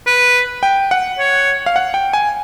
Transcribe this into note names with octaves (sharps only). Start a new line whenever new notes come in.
B4
G5
F#5
C#5
F5
F#5
G5
G#5